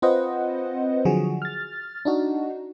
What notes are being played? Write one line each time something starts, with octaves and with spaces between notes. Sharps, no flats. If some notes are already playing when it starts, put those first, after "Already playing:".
C4 F4 B4 C5 D#5 F#5
D3 F3 F#3 F#4 G#4
F6 A6
D4 D#4 F#4